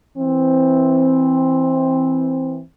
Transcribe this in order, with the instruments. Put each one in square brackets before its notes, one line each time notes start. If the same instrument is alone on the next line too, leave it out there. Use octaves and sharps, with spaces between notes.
[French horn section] E3 C4